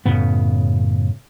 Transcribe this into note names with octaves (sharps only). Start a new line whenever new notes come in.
F#2 A2 C#3 B3